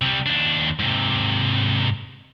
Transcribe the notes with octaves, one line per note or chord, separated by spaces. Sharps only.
C3 G3
D#2 D4
G#2 C3